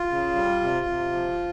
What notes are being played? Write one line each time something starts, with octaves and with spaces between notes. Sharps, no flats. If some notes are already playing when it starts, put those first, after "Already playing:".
Already playing: F4
C#3
G3
C3
C3
F3